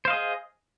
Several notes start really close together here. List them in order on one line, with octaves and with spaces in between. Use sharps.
C5 F5 D#5 G#4